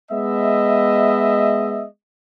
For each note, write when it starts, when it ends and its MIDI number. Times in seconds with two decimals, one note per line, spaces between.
0.11 1.84 56
0.11 1.84 59
0.11 1.84 75
0.11 1.84 76